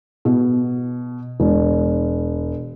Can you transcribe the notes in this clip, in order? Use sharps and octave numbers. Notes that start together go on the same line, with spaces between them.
B2
E1